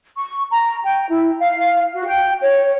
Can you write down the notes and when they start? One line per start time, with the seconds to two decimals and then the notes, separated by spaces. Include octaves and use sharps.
0.17 C#6
0.51 A#5
0.84 G5
1.10 E4
1.38 F5
1.94 F#4
2.05 G5
2.42 C#5